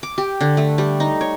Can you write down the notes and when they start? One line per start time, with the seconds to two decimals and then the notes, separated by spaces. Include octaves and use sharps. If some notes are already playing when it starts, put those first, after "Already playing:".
0.03 D6
0.18 G4
0.41 D3
0.57 A3
0.78 G3
1.00 D#4
1.21 C#5